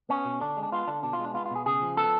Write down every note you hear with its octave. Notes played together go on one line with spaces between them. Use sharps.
B3 C#4
B2
D3 D4
G#3
D4
B3 F4
D3 D4
B2 D4
F4
G#3
D4
B3 F4
F4
B2 G#4
C#3 G#4
F3
B3 A4